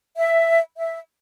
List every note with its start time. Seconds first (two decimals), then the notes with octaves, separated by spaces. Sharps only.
0.16 E5
0.77 E5